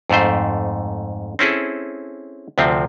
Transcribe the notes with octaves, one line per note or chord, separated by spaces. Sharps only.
F2 G#2 A3 C5
C4 C#4 E4 G#4 A4
D2 C3 F3 C4